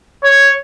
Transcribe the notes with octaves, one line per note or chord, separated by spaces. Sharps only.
C#5